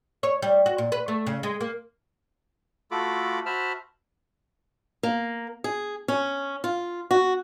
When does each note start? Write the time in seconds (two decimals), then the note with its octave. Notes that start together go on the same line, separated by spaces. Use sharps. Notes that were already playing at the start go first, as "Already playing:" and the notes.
0.23 C#5
0.42 G3
0.66 F#4
0.78 A#2
0.92 B4
1.08 A3
1.27 C#3
1.43 G#3
1.61 A#3
2.91 A3 F4 F#4 A4 B5 D6
3.46 F#4 C5 E5 A5 B5 F6
5.03 A#3
5.64 G#4
6.08 C#4
6.64 F4
7.11 F#4